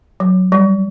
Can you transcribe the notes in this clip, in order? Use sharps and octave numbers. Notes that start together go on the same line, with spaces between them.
F#3
G3